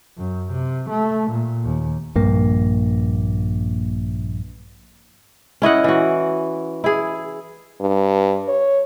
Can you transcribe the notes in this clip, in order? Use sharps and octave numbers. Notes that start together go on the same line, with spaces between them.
F#2
C3
A3
A#2
D#2
A#1 G2 A#3
C#4 E4 D#5 F#5
E3 F#4
E4 G#4
G2
C#5